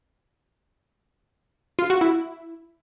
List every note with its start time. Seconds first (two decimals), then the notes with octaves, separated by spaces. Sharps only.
1.79 F4
1.90 F#4
2.01 E4